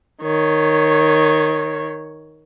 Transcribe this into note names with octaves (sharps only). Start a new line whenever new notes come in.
D#3 C#5